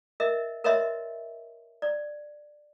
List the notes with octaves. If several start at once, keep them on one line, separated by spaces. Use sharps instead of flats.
A#4 D#5 E5
A#4 B4 C#5 D#5 E5 C6
D5